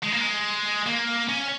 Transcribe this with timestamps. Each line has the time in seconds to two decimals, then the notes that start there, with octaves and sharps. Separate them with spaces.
0.03 G#3
0.12 A#3
0.21 G#3
0.87 A#3
1.29 C#4